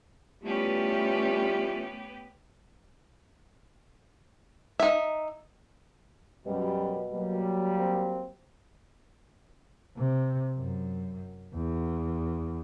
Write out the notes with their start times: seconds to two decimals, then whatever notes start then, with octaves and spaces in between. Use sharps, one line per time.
0.44 E3 G3 A3 B3 C#4 F4 G4 B4
4.80 D#4 E5
6.46 F#2 B2 G3
7.13 F#3 G3 A#3
7.79 C4
9.97 C3
10.56 F#2
11.55 E2